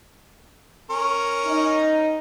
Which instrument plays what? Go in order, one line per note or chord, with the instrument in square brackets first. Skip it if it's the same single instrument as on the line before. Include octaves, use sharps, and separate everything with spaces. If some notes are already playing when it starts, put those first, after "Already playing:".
[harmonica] C#4 A#4 C#6
[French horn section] D#4